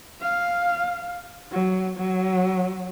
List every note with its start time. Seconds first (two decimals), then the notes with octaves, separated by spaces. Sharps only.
0.21 F5
1.52 F#3
1.97 F#3